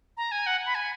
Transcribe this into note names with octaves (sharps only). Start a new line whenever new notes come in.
A#5
G#5
F#5
B5
G#5